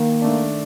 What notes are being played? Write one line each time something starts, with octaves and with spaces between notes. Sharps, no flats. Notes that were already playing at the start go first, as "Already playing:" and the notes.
Already playing: D#3 A#3
A3 D4